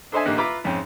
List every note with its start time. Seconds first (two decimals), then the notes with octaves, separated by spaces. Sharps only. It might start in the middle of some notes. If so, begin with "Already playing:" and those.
0.12 D4 A4 C5 D#5 E5 G#5
0.25 A1 D3 A#3 D#4 G4 F#6
0.38 F4 B4 E5 A#5 B5 D6
0.64 G#1 F2 C#4 G5